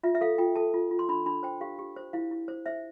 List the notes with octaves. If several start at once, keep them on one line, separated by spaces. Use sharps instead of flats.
F4 E5
E5
A4 F5
F4 G5
A4 A5
F4
F4
C6
D4 B5
D4 B5
C5 G5
G4 F5
G4
C5
E4 F5
E4
C5
C5 E5